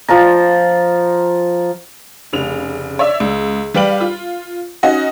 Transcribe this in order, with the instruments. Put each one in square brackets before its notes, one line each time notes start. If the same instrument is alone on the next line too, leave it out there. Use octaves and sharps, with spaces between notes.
[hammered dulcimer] F3 F4 A#5
[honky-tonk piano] F1 C#3 F7
C#5 D5 E5 E6
C#2
G3 G4 B4 F5 D7 F#7
F4
C#4 D#4 F#4 D#5